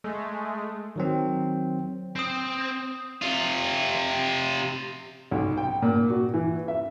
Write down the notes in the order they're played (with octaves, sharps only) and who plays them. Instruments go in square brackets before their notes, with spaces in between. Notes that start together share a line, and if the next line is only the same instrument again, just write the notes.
[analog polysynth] G#3 A3
[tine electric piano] D#3 F#3 C4
[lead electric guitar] C4 [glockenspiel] D#6 C7
[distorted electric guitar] C3 F4
[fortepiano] B1
G5
A#2
F#4
E3
E5